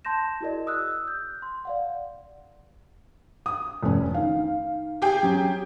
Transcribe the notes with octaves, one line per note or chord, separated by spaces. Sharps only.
A5 C6 G6 A#6 E7
E4 F#4 G#4 A#4 D5 D#5
D#6 E6 F#6
G6
C6
D5 F5 F#5
D#6
F1 C#4
D#3 F5
G4 G#4 G5
F#3 C#4